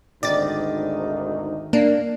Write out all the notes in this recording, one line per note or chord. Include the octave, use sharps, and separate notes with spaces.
G#1 D2 D#3 D#4 D5 A6
A#3 D4